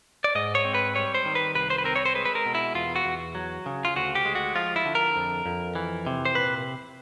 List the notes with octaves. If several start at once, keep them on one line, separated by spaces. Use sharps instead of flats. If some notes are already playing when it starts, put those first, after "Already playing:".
D5
G#2 D#5
C#5
C4
B4
G3 C#5
C5
D#3
B4
C2 B4
C5
B4
C4 A#4
C#5
C5
G#3 B4
B4
A#4
B2
E4
E2 F4
F#4
E2
F#3
C#3
F4
D2 F#4
G4
G#3
F#4
F3 F4
E4
D3
A#4
F2
F2
E3
C3
C5
A#2 B4